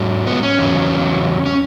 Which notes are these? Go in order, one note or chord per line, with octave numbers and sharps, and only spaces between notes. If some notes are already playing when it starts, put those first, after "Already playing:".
Already playing: G#2 F#3
B3
C#4
E2 C#3 F#3
C#4